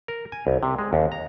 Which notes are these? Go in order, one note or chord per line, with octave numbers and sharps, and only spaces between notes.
A#4
G#5
C2
C3
G#3
D#2
A#5